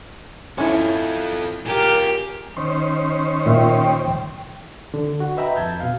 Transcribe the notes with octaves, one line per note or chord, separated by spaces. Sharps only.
C#4 E4 F4 A4
F4 G4 G#4 A#4
D#3 C#4 C5
A#2 E5 G5
D3
F#4
B4 D#5 E5 G5 A#5 B5
F2 A5 G6 G#6
B2 F5